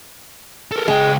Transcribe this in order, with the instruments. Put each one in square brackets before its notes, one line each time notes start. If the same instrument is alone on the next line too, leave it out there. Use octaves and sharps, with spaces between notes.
[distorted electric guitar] A4 A#4
[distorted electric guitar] C#2 G5 [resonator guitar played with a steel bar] G#3